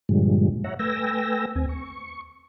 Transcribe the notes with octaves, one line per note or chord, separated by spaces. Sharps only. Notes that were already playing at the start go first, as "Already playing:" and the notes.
G2 A#2 D3 F3 G3 G#3
C#5 E5 F#5 A#5
A3 B4 G5 G#5 E6 A#6
D#2 C4 G#5
C#6